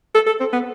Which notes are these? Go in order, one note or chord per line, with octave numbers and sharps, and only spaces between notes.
A4
A4
C4
B3